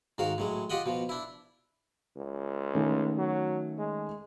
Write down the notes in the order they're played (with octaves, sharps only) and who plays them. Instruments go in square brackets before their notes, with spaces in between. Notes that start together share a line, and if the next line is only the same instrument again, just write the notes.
[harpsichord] G#2 D#3 F#4 F5
A2 F#3 G#3
F4 G4 D#5 F#5 G5
B2 F3
D4 E4
[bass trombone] C#2
[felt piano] D#3 A3 C#4
[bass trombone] F#3
G#3